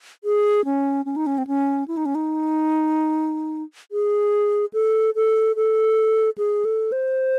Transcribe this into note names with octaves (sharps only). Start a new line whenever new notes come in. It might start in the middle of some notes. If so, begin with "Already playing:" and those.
G#4
C#4
C#4
D#4
C#4
C4
C#4
E4
D#4
C#4
D#4
G#4
A4
A4
A4
G#4
A4
C5